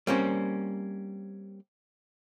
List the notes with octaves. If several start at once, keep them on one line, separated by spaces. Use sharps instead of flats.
G3 A#3 C4 C#4